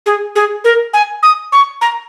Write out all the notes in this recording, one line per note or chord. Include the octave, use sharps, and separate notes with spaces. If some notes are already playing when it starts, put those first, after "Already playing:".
G#4
G#4
A#4
G#5
D#6
C#6
A#5